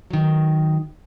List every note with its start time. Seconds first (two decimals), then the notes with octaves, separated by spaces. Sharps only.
0.10 D#3 F#3